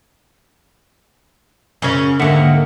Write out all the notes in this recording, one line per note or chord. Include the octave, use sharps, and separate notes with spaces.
F#2 C#3 C#4
D#2 G#2 D3 A#3 E5 F#5